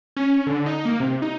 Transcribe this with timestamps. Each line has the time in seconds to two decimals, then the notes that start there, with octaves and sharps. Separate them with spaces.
0.16 C#4
0.47 D3
0.66 D#4
0.85 A#3
1.00 C3
1.22 D#4